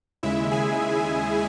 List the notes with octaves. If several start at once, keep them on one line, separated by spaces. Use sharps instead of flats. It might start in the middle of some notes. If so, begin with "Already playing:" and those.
D#2 C#3 G#3 E4 E5
G#4 G#5